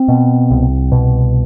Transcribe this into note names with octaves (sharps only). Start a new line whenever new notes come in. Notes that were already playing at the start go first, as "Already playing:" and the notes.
Already playing: C4
B2
C2
B2